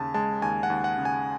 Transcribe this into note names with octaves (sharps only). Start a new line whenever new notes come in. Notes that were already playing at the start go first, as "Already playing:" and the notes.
Already playing: D#2 C#3 G#5 A5
G#3 A5
D#2 G#5
F#5
D#2
F#5
C#3
G#5